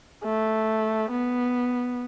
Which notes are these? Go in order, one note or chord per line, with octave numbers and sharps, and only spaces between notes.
A3
B3